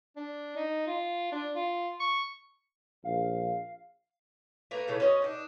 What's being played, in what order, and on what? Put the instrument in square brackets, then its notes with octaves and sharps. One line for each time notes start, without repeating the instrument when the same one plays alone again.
[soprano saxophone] D4
D#4
F4
D4
F4
C#6
[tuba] A#1 [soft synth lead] F5
[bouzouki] A3 A#3 A#4 B4
C#3 E3 A3 B3
C#4 F#4 C5 D#5
D4 D#4